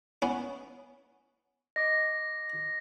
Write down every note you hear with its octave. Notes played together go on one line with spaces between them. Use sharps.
B3 C#4
D#5 D6 A#6